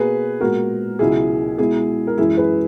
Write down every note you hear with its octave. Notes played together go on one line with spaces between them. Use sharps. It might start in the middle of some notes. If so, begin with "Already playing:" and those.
Already playing: B2 A#3 G#4 B4
A#2 G#3 B3 F#4 A#4
C#2 B2 F#3 E4 G#4
B2 G#3 B3 E4 G#4
A#4
F#2 E3 G#3 E4 G#4
G#4 B4